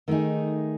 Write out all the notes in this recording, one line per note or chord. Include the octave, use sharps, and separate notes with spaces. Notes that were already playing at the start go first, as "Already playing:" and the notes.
D#3 A3 D#4 G#4